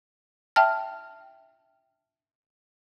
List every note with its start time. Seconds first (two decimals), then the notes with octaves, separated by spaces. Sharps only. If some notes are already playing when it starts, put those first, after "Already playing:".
0.56 E5 G5 A5 F6